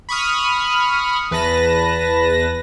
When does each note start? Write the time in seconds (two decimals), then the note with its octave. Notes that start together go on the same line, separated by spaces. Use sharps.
0.09 B5 C#6 D#6 F6
1.31 E2 B4 A5 A#6